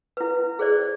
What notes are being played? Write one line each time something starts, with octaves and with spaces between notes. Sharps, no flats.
E4 B4
G#4 C5 D5